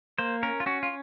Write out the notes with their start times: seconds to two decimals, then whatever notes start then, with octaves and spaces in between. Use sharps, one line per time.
0.18 A#3 C5
0.43 C#4 A#4
0.60 F4
0.66 C#4 F#4
0.83 F4